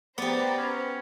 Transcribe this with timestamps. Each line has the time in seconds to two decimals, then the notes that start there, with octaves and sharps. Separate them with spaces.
0.18 B3 G4 B4 C5 D5 A#5
0.57 C#4